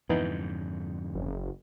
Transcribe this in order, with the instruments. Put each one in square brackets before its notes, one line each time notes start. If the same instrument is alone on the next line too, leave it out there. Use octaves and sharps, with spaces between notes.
[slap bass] F2 G#2 D3 [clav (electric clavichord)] E3 B3 D#4
[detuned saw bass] F#1